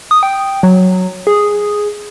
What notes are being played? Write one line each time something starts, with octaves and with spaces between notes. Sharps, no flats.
D#6
G5
F#3
G#4